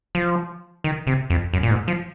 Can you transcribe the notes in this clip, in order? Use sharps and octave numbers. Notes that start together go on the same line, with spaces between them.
F3
D#3
C3
F2
F#2
A#2
G#2
F3